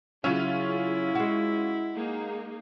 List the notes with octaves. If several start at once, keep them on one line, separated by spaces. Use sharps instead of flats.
C#3 F#3 C#4 E4 F4 G#4 E5
G#3 F#4
A#3 D#4 G#4